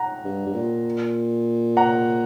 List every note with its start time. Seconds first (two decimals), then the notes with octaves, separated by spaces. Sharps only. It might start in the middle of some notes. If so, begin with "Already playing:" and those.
Already playing: F#5 A#5
0.24 G2
0.46 G2
0.55 A#2
1.77 F#5 A#5